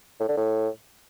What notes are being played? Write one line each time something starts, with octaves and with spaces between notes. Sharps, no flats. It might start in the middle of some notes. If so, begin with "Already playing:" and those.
A2
D3
A2